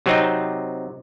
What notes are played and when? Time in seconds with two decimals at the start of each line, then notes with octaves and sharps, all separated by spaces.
0.06 C3 F#3 C4 D#4